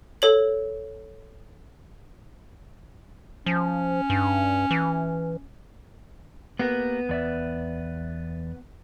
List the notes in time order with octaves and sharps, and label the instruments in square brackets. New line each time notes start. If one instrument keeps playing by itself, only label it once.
[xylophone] A4 C#5 F#7
[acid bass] F3 [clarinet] C#4
[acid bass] G2
E3
[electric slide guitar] A#3 G4 A#4 [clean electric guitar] B3
[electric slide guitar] E2 D5 E5